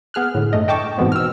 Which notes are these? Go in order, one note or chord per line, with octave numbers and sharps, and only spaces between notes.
B3 G#4 F6 F#6
A2 D3
G2 A3 D#5
D#5 G5 A5 C#6 D6
G#2 B2 E3 G#3 B3 C4
E6 F6